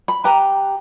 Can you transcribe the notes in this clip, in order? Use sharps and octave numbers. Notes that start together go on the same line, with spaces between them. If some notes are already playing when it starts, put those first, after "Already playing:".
B5
G4 B4 A#5